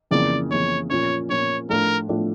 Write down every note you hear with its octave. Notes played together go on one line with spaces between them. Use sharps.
F2 C#3 E3 A#3 D5
F2 C#3 E3 A#3 C#5
A#2 F3 C#4 C#5
A#2 F3 C#4 C#5
A2 F3 A3 D4 F4 A#4
A2 F3 A3 D4 F4